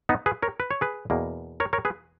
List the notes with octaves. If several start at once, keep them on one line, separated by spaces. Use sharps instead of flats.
B3 D#4
G#4 B4
A#4 C#5
B4
C#5
G#4 B4
E2 B2 A#3
A#4 C#5
A#4 C#5
G#4 B4